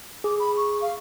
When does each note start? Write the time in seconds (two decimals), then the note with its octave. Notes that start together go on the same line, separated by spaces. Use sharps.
0.24 G#4 D6
0.39 B5
0.57 C#6
0.81 F5